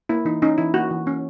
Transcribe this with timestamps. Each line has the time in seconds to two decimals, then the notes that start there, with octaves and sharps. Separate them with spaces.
0.09 A#3 E4
0.25 E3 D#4
0.42 C#4 D#4
0.58 E3 E4
0.74 A#3 F#4
0.91 E3
1.06 A#3 C#4